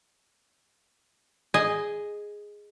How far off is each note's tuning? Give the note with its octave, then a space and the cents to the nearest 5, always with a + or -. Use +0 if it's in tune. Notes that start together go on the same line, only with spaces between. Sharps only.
G#4 +0 D#5 +0 G#5 +0